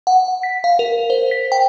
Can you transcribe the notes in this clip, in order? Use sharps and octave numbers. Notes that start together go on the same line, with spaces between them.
F#5
B6
F5
A#4
C5
B6
G5